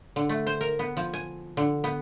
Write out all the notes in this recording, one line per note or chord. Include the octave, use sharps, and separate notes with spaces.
D3
A3
C5
A#4
B3
F3
G#5
D3
B3